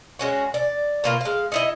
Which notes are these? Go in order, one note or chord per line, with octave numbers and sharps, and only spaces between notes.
G#3 C#4 F#4
D5
B2 A#3 F4
G#3 F5
D#4 E4 D#5